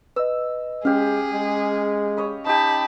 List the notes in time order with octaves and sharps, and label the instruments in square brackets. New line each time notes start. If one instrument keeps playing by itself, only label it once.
[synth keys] B4 D#5 [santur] E6
[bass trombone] G#3 [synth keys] C#4 [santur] G4 F5 [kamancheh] G#4
[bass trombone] G#3
[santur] C#5 D#5 B5
[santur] D#4 G4 [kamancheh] A5 B5